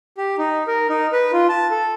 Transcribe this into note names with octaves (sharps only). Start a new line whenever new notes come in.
G4
D#4
A#4
D#4
B4
F4
A5
A4